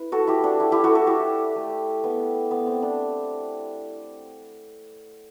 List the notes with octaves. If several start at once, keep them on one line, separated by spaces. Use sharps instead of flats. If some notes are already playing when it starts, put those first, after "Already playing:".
Already playing: E4 B4
F#4 A4
E4 G4
D4 F#4
E4 G4
E4 G4
F#4 A4
F#4 A4
E4 G4
A3
B3
B3
C4
D4